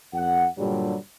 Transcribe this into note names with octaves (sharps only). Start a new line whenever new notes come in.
F2 F#5
G2 A#2 D3 F#3 G3